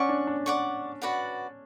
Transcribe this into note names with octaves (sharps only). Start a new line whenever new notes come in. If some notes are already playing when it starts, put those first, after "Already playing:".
Already playing: C#4 D5 F#5 C#6
D4
D4
D5 F#5 C#6
F#4 B4 D5 F#5